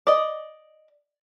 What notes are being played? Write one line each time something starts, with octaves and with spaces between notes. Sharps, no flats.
D5 D#5